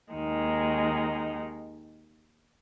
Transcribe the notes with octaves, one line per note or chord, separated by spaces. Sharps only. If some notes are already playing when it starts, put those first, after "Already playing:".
D#2 D#3 G#3 D#4